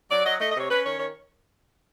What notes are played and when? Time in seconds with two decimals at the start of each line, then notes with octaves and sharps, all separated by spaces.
0.10 F#3 D5
0.25 F#3 D#5
0.40 A3 D#5
0.51 D#5
0.56 C3 C#5
0.70 C#4 B4
0.84 D#3 C#5
0.99 D#3 C#5